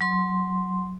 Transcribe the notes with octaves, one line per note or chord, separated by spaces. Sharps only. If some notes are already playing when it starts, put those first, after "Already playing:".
F#3 C6